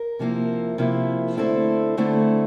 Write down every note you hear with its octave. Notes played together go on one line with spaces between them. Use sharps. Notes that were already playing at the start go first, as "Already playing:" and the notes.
Already playing: A#4
C3 F3 A#3 E4
C3 F3 A#3 E4
D3 A3 C4 E4 A4
D3 A3 C4 E4